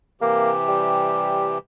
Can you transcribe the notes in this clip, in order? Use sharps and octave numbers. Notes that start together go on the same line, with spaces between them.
C3 E3 A#3 G4
G3